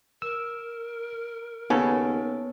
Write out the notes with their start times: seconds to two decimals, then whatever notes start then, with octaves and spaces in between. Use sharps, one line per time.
0.22 A#4 E6
1.70 D#2 C#3 B3 A4 C#5